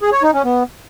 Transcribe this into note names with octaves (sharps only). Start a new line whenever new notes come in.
G#4
C#5
D#4
C#4
B3